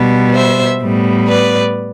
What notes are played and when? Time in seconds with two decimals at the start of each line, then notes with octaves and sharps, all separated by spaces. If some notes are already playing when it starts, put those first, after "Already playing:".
Already playing: B2 G3 B3
0.34 C5 E5
0.82 A2 G3 B3
1.28 B4 D5